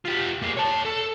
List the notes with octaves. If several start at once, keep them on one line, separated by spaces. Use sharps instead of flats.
F4 G4
A#3 G#4
C#5 A5
A4